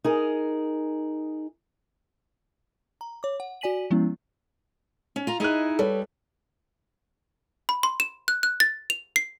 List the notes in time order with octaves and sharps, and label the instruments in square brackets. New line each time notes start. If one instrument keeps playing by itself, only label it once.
[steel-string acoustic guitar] D#4 G#4 A#4
[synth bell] A#5
C#5 D6
F#5
F#4 D5 G#5 B6 D#7 F#7
F3 G#3 B3 C#4 E4
[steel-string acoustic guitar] C#4
F4 A#5
[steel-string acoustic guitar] D#4 E4 G#4 [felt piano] D#5 F#6
[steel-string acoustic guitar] G3 [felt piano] A4 B4 C#5
[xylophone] B5
C6
E7
F#6
F#6
A6
F7
C7